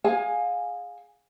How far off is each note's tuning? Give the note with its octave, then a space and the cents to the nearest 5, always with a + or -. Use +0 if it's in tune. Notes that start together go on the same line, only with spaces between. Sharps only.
G#4 +0 F5 +25 G#5 -10